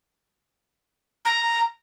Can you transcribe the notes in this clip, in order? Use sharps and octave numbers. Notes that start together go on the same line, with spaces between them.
A#5